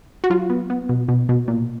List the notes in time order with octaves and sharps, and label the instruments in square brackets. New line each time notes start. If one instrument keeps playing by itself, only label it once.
[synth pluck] F#4
F#3 F4
B3
B3
B2
B2
B2
A#2